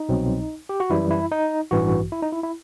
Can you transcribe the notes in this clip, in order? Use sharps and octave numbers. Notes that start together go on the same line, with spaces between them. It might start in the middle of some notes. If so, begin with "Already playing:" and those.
Already playing: D#4
C2 B2 F#3 C4
G4
F#4
F#2 E3 G3 E4
E4
D#4
A1 G2 E3 F#4
E4
D#4
E4
E4